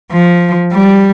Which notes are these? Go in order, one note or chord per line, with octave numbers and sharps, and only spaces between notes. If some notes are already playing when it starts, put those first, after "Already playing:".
F3
G3